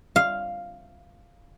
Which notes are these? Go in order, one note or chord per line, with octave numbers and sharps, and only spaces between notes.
F5